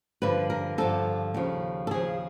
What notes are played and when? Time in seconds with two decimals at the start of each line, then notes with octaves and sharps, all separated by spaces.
0.22 G2 D3 F3 B4
0.50 A#4
0.78 G2 D3 F3 A4
1.34 D#2 C#3 F3
1.87 A4
1.91 D#2 C#3 F3 G#4